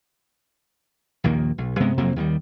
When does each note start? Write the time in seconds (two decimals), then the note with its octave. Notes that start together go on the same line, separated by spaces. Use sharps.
1.24 A#1 D#2 D#3 A#3
1.58 B1
1.80 G2 C3 G#3 B3
1.98 F2 C3 F#3 A#3
2.16 D#2 D#3 F#3 G3